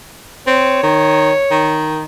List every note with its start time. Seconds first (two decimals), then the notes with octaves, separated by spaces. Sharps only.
0.47 C4 C#5
0.83 D#3
1.51 D#3